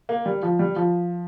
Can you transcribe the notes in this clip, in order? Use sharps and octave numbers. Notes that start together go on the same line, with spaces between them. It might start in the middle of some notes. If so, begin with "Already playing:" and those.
A#3
G3
F3
G3
F3